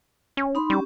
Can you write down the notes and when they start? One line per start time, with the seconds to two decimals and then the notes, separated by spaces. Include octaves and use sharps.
0.37 C#4
0.55 D#4 B5 C6
0.70 G3 C#4 G4